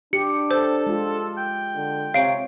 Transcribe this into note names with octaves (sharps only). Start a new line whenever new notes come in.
D4 G4 C#7
A4 C5
G#3 F4
G5
D3
C3 C#5 F5 D7